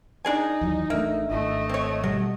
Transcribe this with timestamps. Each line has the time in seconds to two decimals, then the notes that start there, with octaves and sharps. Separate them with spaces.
0.25 D4 D#4 G#4 G#5
0.61 D#2 E3 F#3
0.90 A1 A3 A#3 D4 E5
1.29 G#1 A3 D#5
1.69 C4 C#5
2.04 B2 F#3 G3